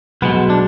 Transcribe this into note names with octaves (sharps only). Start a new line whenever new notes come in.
B1 B2 G#3 B3
D4